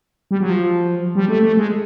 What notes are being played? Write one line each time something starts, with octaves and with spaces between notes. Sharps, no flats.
G3
F#3
F3
G3
A3
A3
G#3